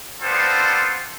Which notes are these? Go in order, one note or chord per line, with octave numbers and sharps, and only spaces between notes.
B3 C4 D4 F4 A4 C5